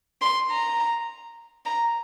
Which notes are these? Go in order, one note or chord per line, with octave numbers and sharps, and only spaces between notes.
C6
A#5
A#5